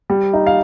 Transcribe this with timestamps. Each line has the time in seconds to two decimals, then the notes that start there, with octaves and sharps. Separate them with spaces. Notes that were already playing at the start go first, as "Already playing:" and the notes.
0.10 G3
0.33 D#4
0.47 F5